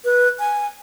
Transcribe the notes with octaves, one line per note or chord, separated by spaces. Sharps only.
B4
G#5